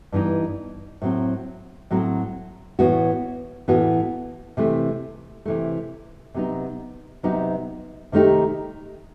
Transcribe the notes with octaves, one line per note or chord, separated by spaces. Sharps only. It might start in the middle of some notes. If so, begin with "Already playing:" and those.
G2 E3 B3 D#4
A2 F#3 C4
A2 F#3 C4
A2 E3 B3 F#4
A2 E3 B3 F#4
C3 E3 A3
C3 E3 A3
C3 F#3 B3 D#4
C3 F#3 B3 D#4
C3 D#3 A3 D#4 G4